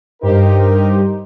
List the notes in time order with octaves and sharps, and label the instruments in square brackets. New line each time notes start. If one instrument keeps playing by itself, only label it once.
[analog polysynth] G2 G4 C5 [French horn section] D#4 A#4